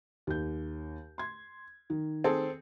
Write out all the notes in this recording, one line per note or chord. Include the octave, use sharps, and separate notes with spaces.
D#2 G6
C6 G#6
D#3
C4 G#4 A4